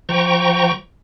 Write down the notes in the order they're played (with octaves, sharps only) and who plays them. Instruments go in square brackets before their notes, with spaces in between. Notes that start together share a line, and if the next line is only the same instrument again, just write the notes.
[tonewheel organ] F3 G5 A#5 C#6